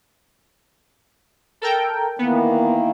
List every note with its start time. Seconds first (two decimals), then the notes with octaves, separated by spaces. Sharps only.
1.61 A4 A#4 G5
2.19 D#3 E3 A#3 B3